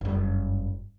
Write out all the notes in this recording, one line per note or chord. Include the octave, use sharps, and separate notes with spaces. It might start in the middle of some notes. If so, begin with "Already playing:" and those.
F#1 G2